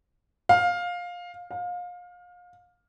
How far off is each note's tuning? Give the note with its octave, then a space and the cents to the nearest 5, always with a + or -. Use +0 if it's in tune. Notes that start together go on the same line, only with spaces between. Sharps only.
F5 +15
F5 +30